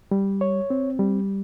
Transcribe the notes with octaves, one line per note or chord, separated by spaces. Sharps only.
G3
C#5
C4
G3